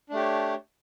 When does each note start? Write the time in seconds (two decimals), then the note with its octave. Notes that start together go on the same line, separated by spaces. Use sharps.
0.09 D4
0.13 A3
0.16 G4
0.19 C#5